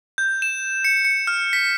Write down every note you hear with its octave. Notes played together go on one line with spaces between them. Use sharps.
G6
E7
C#7
C#7
F6
B6